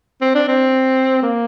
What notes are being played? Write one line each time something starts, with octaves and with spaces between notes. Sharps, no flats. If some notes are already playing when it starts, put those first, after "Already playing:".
C4
D4
C4
A#3